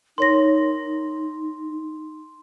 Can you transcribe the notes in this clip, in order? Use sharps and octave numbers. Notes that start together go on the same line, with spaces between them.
D#4 A#4 C#5 C6 A#6